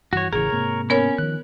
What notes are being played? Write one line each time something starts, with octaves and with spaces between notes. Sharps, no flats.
G2 E3 F#4 C#5
A1 C#3 E3 G#4 A#4 C#5
G#2 C3 A#3
B3 C#4 A#4 C#5
D#3 F3 F#6